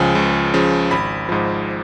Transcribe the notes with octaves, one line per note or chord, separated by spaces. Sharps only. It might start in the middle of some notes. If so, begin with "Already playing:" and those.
Already playing: C#2 C#3 F3 G#5
C#2
C#3 F3
G#1 B5
G#2 F3